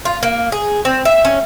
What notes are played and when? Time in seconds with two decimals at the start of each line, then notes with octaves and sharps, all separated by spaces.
0.05 F4
0.23 A#3
0.52 G#4
0.85 C4
1.05 E5
1.25 C#4